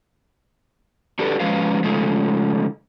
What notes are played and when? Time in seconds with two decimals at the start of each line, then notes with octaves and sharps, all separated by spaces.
1.19 D4 F#4 G4 A4 B4
1.40 F3 F#3 G#3 C#4 B4 F5
1.84 C#3 F3 G#3 A3